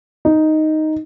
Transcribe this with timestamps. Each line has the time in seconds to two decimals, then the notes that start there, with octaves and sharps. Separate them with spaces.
0.25 D#4